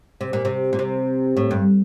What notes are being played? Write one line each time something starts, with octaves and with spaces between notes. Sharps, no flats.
C3
A#2
C3
A#2
C3
A2
G2